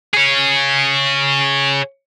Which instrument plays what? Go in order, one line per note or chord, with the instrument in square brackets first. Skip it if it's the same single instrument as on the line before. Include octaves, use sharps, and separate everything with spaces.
[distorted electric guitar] G#4 C#5